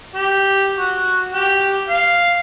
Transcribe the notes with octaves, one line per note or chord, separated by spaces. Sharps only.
G4
F#4
G4
F5